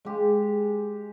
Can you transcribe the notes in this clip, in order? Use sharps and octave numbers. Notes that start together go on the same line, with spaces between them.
G#3 G4